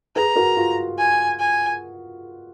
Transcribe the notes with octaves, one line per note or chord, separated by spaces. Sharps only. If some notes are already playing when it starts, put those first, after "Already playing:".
G#4 B4 A#5
F#4 A#4
F4
G#5
G#5